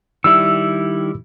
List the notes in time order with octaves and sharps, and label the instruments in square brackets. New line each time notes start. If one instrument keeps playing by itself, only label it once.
[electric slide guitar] D#3 G3 E4 [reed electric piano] E6